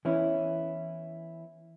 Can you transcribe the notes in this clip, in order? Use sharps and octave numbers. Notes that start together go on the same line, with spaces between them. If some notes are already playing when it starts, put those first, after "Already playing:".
E3 B3 C#4 E4